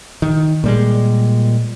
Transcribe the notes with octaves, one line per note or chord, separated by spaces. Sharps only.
D#3
A#2 G3 G#3